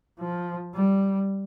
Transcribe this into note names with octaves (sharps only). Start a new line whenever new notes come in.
F3
G3